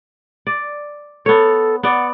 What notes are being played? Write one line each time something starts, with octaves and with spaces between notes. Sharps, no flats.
D5
B3 A4 C#5
B3 D5 F#5